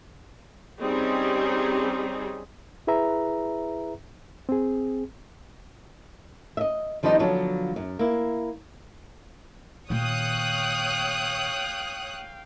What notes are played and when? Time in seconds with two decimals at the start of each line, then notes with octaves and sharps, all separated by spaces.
0.80 G3 C4 C#4 D#4 G4 G#4
2.87 E4 G#4 B4 E5 A#5
4.49 C4 G#4
6.57 D#5 E5
7.03 D#3 F3 G3 B3 D#4
7.19 D3 F3 F#3 B3
7.76 F#2
7.99 A#3 E4
9.90 A#2 D#3 C#5 F5 G5 D#6 F#6